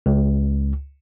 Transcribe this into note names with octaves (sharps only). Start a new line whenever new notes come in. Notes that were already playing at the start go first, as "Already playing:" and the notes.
C#2